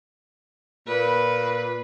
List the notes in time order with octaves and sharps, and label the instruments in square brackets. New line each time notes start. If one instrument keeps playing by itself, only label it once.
[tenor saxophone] A#2 [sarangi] B4